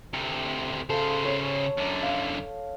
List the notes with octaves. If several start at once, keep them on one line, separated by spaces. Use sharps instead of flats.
D2 C3
C#3 A4 C5 F5
C#5 E6
F#2 D3
F5